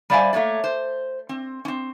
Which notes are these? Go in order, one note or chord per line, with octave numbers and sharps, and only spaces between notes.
G3 C5 D5 E5 F5 G#5
A3 A#3 C#5 D5
C5
C4
C4 C#4